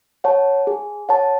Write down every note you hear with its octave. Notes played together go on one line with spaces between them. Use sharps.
C#5 F#5 A5
G#4
C#5 F#5 A5